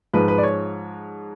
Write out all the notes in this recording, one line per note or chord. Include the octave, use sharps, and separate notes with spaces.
G#2 F3 G#3 B4
B4
D5
C#5